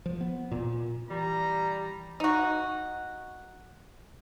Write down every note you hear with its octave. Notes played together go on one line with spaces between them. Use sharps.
F3
B3
A#2
E3 G3 A#5
D#4 F#4